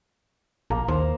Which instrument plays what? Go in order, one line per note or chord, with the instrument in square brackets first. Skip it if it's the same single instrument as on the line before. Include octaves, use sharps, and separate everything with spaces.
[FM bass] A#1 [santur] A#3 A#4
[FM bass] D#2 [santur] A#4 C5